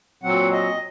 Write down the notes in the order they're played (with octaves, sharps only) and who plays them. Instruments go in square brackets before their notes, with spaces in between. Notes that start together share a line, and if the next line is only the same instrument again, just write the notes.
[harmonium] A#2 F#3 C4 F#5
D#5